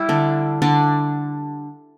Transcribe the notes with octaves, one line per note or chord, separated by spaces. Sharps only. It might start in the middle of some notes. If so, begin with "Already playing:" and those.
Already playing: G3 E4 G4
D3 D4
D3 D4